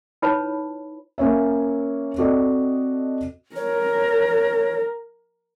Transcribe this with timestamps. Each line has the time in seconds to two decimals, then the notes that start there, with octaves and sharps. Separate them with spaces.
0.22 D#4 E4 B4 C#5 A5 B5
1.18 A#3 C#4 C#5 E5
2.18 C4 F#4 A4 D5 D#5
3.56 A#4 C#5